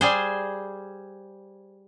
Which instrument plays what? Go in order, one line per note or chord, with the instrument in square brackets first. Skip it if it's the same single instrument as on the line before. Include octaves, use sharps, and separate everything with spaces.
[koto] G3 G#4 C5